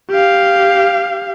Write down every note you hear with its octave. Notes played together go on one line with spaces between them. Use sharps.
G4 F5